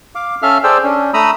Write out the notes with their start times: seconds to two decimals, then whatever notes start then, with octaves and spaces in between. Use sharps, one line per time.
0.15 F5 D6
0.42 C#4 A4 E5 F5 F6
0.64 G#4 A4 C5 D5 G5 E6
0.83 C#4 D4
1.14 A3 A#5 B5 D#6 E6